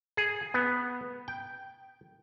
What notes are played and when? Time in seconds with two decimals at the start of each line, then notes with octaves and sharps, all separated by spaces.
0.17 G#4
0.54 B3
1.28 G5